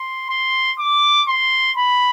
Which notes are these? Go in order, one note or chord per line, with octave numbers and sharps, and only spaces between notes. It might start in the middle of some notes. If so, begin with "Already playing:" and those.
Already playing: C6
C6
D6
C6
B5